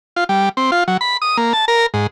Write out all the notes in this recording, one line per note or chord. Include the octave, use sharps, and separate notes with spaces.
F4
G3
C4
F4
F#3
B5
D#6
A#3
A5
A#4
G#2